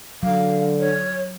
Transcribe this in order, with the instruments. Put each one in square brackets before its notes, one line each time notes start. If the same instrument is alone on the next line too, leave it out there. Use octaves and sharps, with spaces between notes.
[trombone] D3 [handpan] F#3 [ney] F5
[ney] C#5